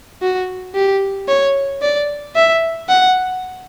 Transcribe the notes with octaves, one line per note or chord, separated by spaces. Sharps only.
F#4
G4
C#5
D5
E5
F#5